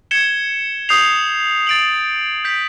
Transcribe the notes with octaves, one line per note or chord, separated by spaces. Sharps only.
G#6 C#7 E7 G7
D#6 G6 C7 F7
A6 D7 F#7
G6 B6 D7 F#7